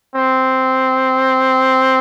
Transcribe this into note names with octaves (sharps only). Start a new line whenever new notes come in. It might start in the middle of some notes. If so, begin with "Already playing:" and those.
C4